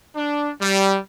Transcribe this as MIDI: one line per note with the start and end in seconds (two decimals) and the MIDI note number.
0.16 0.52 62
0.61 0.98 55